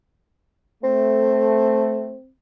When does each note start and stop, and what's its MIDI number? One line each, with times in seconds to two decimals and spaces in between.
0.84 2.14 57
0.84 2.30 60